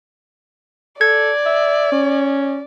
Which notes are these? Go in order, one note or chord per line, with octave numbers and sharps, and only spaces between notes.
A4 D5 G#6
E5
C#4